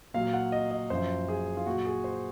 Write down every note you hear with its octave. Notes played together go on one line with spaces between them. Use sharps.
A#2 F#3 F5
F#5
D#5
D#5
F#2 F3 C5
G#4
F4
A#2 F#3 F#4
G#4
C5